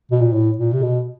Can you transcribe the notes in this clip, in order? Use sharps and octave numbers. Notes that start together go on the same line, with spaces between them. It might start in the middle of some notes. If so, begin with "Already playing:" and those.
B2
A#2
A2
A#2
C3
B2